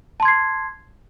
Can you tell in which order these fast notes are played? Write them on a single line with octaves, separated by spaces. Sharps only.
A5 C6 G#6 C7